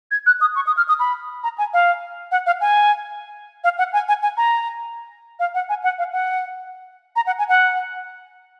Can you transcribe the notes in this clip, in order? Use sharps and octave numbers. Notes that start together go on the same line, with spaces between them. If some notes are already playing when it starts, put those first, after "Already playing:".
G#6
F#6
D#6
C#6
D#6
F6
D#6
B5
A#5
G#5
F5
F#5
F5
G#5
F5
F#5
G#5
G#5
G#5
A#5
F5
F#5
G#5
F#5
F5
F#5
A#5
F#5
G#5
F#5